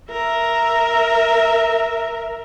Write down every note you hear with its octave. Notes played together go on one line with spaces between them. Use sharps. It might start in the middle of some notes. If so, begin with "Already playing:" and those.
A#4 E5